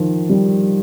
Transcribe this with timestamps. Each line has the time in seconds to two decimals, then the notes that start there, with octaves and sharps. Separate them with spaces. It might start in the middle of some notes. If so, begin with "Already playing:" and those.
Already playing: D#3 F3
0.29 G3